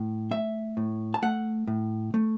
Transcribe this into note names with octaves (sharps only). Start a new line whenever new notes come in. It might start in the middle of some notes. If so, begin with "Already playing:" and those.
Already playing: A2
A3 E5
A2
A5
A3 F#5
A2
A3